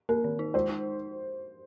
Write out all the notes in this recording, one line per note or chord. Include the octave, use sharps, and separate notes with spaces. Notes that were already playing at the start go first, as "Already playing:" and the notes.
A#3 A#4
D#3
D#4
G#3 C5
D#4